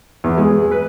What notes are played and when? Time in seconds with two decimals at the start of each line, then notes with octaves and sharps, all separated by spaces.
0.24 E2
0.38 G#3
0.71 B4